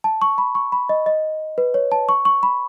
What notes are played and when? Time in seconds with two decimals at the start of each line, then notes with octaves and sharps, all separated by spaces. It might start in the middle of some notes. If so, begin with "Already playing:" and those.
0.04 A5
0.22 C#6
0.38 B5
0.55 C#6
0.72 B5
0.89 D#5
1.06 D#5
1.58 B4
1.74 C#5
1.92 A5
2.09 C#6
2.25 C#6
2.43 B5